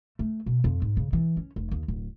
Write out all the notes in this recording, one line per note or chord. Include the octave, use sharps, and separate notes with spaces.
A3
B2
F2
G#2
C#3
E3
C#4
F1
D#2
D1